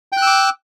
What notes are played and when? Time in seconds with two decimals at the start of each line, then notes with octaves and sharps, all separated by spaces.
0.12 G5
0.17 F#6
0.22 E6
0.27 D6